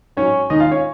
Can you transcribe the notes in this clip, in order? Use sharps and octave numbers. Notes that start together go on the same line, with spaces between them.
G#2 F#3 C#4 C#5
D#2 D#3 G#3 D#4 D#5
F4 F5
C#4 C#5